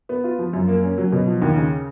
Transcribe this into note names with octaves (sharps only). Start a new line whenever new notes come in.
B3
F4
F3
F#2
A#3
C#4
F#3
B2
F3
D#2
C#3